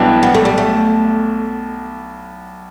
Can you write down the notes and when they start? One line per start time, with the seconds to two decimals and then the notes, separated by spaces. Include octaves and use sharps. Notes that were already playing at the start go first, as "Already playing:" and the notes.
Already playing: B1 B2 E3 G3 D4 G4
0.23 B3
0.35 A3
0.45 G3
0.58 A3